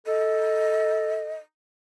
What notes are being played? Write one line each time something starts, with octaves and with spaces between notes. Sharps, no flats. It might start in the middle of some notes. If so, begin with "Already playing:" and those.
A4 D#5